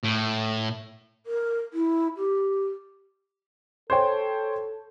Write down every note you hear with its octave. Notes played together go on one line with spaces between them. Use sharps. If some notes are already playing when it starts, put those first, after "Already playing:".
A2
A#4
E4
G4
A4 C5 C#5 G5